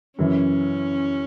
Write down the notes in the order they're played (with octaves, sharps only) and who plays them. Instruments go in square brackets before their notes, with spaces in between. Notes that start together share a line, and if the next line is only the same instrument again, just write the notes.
[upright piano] F#2 C#3 E3 [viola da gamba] C#4